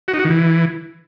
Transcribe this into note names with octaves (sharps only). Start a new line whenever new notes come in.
F#4
D#4
F#4
D#3
E3